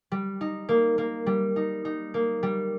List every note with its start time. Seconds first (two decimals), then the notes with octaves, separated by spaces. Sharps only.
0.12 G3
0.41 D#4
0.69 A#3
0.98 A#3
1.26 G3
1.56 D#4
1.85 D#4
2.14 A#3
2.43 G3